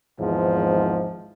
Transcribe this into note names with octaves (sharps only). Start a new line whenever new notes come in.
G#1 E2 G#2 F3